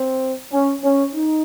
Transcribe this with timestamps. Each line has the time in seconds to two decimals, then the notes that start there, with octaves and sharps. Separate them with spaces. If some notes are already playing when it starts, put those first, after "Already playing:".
Already playing: C4
0.52 C#4
0.83 C#4
1.14 D#4